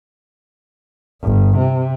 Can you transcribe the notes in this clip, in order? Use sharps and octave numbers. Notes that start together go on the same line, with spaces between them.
G1
C3